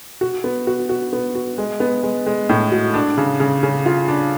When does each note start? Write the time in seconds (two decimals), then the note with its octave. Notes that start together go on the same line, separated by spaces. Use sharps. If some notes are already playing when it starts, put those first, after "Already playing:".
0.21 F#4
0.44 B3
0.67 F#4
0.89 F#4
1.13 B3
1.35 F#4
1.58 G#3
1.80 B3
2.03 G#3
2.26 G#3
2.49 A2
2.72 F#4
2.94 D4
3.18 C#3
3.40 C#3
3.63 C#3
3.86 F4
4.08 D4